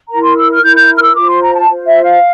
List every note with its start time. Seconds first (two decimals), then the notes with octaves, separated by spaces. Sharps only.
0.09 E4 A#4 A#5
0.22 C6
0.36 E6
0.50 F6
0.63 E4 A#4 G6
0.76 G6
0.97 F6
1.02 E6
1.15 F4 C5 D6
1.29 C6
1.41 A#5
1.54 A5
1.68 F4 C5
1.86 E5
2.03 F5